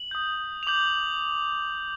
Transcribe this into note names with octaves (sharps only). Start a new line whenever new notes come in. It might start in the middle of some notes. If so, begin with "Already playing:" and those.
Already playing: F#7
D#6 G6
F7
D6 G6 F#7